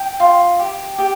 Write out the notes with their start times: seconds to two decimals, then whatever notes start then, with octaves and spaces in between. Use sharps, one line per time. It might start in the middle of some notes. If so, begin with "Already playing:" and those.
Already playing: G5
0.20 F4
0.59 G4
0.98 G4